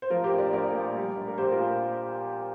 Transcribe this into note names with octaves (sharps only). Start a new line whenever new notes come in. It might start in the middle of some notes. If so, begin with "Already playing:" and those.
C5
F3 F4 A#4
G4 C5
A#1
A#4 D5
A#1 A#4 D5
A#2
G3
A#1
A#4
A#1 G4 C5
F4 A#4
A#2